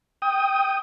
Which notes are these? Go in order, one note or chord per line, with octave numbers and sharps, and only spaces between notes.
G5 D#6